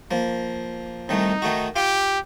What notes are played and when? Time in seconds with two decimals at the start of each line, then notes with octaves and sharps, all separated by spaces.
0.11 F3 A#3
1.09 C2 D#3 A3 D#4
1.42 D#3 A3 F#4
1.76 F4 G4 F5 D6